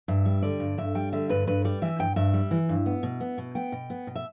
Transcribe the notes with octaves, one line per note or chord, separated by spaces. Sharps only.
G2 E5
G3
D3 D5
G2
G2 E5
G3 G5
D3 E5
G2 B4
G2 B4
G3 D5
E3 E5
G2 G5
G2 E5
G3
E3
G2
B3
B2
B3
B2
B3 G5
B2
B3
B2
E5